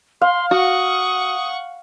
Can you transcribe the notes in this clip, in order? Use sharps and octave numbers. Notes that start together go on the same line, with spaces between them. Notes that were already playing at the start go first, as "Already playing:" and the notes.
F5 C6
F#4 F#5 C#6 D#6